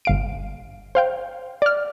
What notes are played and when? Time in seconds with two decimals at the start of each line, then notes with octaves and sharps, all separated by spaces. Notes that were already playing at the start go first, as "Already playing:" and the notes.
0.05 G1 F5 D7
0.95 C5 F5 G5
1.62 D5 F6